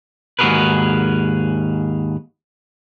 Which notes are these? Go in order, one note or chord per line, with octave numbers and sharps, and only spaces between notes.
D#2 G#2 F#4 G#4 A#4 B4